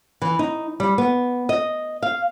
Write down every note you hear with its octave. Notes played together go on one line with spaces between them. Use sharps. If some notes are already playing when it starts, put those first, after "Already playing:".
E3
D#4
G3
B3
D#5
F5